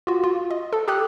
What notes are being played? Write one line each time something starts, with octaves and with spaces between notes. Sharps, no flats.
F4 F#4
F4
D#5
A4 A5
G4 A4 G5 D#6 F6 F#6